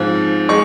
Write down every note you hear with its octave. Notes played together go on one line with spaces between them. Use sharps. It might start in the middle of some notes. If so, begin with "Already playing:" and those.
Already playing: G#2 F3 C4
G#3 C#6